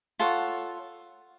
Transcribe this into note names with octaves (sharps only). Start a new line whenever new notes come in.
F4 A4 C#5 F#5